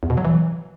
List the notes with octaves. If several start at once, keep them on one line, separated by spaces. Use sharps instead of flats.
E2
B2
F#3
E3